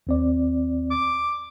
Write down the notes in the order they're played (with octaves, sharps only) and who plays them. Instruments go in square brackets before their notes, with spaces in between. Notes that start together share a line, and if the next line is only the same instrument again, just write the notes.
[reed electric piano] D#2 C4 D5
[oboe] D6